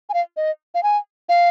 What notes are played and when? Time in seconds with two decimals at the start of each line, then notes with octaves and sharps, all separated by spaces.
0.09 G#5
0.14 F5
0.37 D#5
0.75 F5
0.83 G#5
1.29 F5